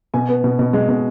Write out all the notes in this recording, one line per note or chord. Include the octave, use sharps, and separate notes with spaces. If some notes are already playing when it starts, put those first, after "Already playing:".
B2 G#5
B3
B2
B2
G#3
B2